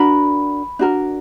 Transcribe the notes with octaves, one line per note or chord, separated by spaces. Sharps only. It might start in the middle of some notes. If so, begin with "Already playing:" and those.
Already playing: D4 F#4 A#4 B5
D4 F#4 A#4